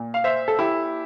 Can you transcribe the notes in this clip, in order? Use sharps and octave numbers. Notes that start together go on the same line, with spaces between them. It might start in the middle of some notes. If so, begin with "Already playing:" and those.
Already playing: A#2
F5
C5 E5
A4
E4 G4